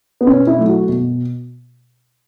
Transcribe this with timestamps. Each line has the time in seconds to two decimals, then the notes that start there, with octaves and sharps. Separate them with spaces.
0.21 B3
0.27 B2 C#4
0.47 E4
0.58 F#3 A3
0.68 F#4
0.88 B2